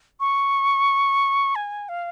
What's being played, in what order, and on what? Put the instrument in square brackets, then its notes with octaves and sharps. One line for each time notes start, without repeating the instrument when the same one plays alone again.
[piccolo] C#6
G#5
F5